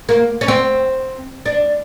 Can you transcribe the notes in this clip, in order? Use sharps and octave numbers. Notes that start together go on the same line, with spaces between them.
A#3
C#4
C4
D4